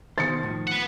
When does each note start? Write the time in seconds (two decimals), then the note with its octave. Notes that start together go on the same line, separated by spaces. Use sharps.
0.18 B2 D#3 C5 A6 C#7
0.43 A2 D#3 F3
0.67 B4 F#5